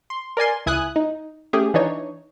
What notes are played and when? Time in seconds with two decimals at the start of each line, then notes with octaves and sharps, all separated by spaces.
0.10 C6
0.37 A#4 D5 G#5 C6
0.66 C#2 E4 G#5 D#6 F#6
0.96 D#4
1.53 A3 C#4 G4 G#4
1.74 E3 D4 D#4 C#5